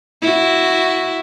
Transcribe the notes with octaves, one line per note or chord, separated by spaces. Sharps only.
E4 F#4